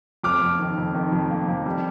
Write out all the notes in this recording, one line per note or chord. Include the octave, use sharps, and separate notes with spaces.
F2 D6 F6
F2
D#3
F2
D#3
F2
A#3
F2
G3